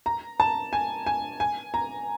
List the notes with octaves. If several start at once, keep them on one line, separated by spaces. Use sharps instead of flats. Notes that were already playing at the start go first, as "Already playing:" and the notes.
A#5
A5
G#5
G#5
G#5
A#5